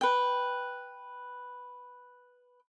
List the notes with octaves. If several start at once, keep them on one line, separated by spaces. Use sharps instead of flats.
B4 G5